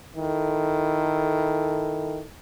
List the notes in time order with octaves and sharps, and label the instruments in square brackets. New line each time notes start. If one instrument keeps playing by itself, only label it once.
[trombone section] D#3 E4 A4